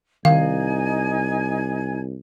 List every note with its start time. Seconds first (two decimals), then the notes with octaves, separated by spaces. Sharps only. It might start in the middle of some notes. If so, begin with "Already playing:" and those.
0.25 C2 D#3 D#4 F5 G#5 G#6